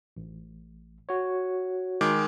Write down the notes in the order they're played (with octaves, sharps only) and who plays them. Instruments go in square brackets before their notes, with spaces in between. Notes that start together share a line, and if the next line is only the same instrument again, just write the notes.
[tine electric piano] A1
F#4 C#5
[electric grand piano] D#3 G#3 D6